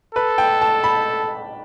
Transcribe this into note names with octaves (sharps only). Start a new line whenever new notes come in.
A4 B4
G5
A5
B5